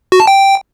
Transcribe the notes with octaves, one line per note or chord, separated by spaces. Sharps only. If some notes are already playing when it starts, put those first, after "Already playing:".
F#4
A5
G5